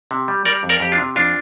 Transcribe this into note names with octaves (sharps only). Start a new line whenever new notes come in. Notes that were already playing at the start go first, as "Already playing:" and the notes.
C3
G3
G3 A#4 D5
F2
A#4 D5
F2 G4
D4 F4
C3
F2 D4 F4